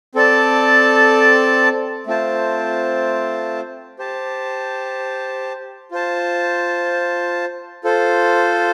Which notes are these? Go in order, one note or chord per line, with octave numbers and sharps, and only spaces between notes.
C4 A4 D5 A5
A3 C4 F4 C5 A5
G4 C5 A5
F4 C5 A5
F4 A4 C5